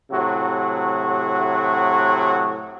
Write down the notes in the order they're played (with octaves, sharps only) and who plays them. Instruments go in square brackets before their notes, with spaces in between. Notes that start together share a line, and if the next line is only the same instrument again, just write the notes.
[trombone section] A2 C3 F#3 F#4